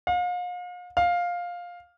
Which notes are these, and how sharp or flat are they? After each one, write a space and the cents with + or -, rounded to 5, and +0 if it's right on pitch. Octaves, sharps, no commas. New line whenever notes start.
F5 +40
F5 +10